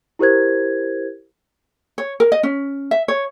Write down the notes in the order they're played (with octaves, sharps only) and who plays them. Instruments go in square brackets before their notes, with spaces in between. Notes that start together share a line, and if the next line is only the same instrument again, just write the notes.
[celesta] E4 G4 A#4 C5 G#6
[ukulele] C#5
A#4
D#5
C#4
E5
C#5